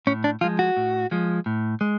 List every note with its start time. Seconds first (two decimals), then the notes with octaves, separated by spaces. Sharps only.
0.07 A2 C#4
0.24 D4
0.41 F3 F4
0.44 G#3
0.59 F#4
0.77 A2
1.11 F3 G#3
1.46 A2
1.81 G#3